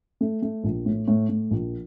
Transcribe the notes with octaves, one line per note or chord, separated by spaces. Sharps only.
A3
A3
A#1
A2
A2
A2
A#1